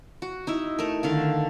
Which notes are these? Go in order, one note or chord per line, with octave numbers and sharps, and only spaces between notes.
F#4
D#4 E4 E5
A3 A#4
D3 D#3 F5